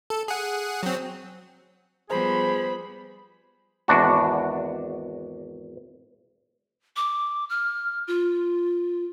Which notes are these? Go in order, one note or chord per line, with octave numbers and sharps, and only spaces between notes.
A4
G#4 F#5
F#3 C4
F3 G3 B3 G#4 C5 B5
G#1 E2 D4 F#4
D6
F6
F4